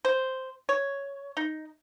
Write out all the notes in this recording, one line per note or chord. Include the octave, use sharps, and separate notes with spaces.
C5
C#5
D#4